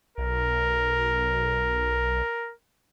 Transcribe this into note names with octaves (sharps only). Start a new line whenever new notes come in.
B1 A#4